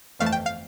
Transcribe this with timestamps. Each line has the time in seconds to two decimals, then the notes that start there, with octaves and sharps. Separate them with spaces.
0.19 G1 F2 E3 A3 F5
0.26 A5
0.32 G5
0.46 F5